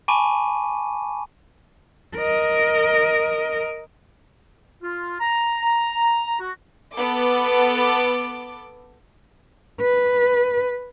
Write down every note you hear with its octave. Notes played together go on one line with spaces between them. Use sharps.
G#5 A5 B5 C#6 D6 D#7
A#4 D#5
F4
A#5
F#4
B3 A4 D6
B4